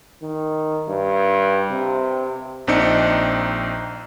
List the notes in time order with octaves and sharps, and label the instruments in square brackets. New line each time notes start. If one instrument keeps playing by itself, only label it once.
[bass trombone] D#3
G2
C3
[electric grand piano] A#1 C4 D4 D#4 C#7